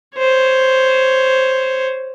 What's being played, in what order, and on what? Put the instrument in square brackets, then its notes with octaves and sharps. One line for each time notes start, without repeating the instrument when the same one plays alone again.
[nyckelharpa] C5 C#5